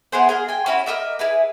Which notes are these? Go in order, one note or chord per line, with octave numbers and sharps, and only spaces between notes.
B3 E4 G#4 C5
G#4 A#4 D#5
G5 G#5
C#4 E4 F#4 B5
A#4 D#5 E5 D6
E4 G#4 B4